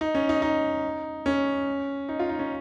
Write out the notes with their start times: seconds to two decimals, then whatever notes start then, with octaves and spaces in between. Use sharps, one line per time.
0.01 D#4
0.15 C#4
0.29 D#4
0.42 D#4
1.26 C#4
2.09 D#4
2.19 F4
2.29 D#4
2.39 C#4